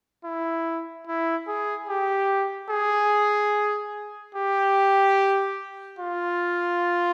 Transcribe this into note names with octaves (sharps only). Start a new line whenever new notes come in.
E4
E4
G#4
G4
G#4
G4
F4